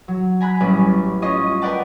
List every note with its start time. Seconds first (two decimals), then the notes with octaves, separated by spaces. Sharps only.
0.08 F#3
0.40 G#5 A#5 B5 F#6
0.60 A1 G3 C#4
1.22 C#4 F4 C#5 D#5 C#6 A#6
1.62 A#4 B4 D5 F#5 G5 A5